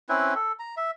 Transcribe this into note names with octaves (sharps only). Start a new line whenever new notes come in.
C4 C#4 E4 B4
A4
A#5
E5